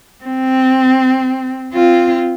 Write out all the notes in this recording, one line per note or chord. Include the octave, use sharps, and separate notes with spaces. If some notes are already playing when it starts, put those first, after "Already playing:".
C4
C4 F4